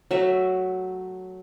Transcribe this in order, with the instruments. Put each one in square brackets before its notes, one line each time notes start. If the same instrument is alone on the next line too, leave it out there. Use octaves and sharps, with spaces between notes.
[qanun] F#3 A3 E5